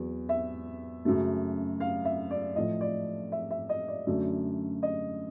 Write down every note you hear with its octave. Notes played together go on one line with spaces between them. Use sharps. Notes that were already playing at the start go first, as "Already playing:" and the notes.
Already playing: E2 F#3
E5
F#2 C#3 F#3 A3
F5
E5
D5
A2 F3 A3 D#5
D5
E5
E5
D#5
D5
F#2 D3 F#3 A3
D#5